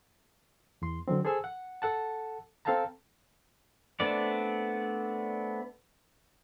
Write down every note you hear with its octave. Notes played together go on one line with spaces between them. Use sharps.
E2 C6
D3 F#3 C4
G#4 A4 C5 G#5 E6
F#5
A4 F#5 A5
C4 A4 F5 G5 A5 A#5
A3 B3 C4 D4 D5